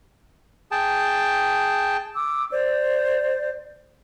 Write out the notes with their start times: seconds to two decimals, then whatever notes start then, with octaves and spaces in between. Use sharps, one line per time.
0.71 G#4 G5 A5
2.16 D6 E6
2.51 C5 D5